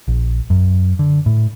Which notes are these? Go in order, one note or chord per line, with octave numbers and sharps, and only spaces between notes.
A#1
F#2
D3
A2